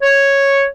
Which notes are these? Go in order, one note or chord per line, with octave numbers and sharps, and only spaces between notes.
C#5